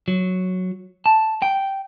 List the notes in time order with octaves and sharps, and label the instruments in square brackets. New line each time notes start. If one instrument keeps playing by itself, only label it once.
[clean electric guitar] F#3
A5
G5